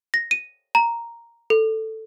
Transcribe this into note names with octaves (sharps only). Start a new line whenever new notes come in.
A#6
D#7
A#5
A4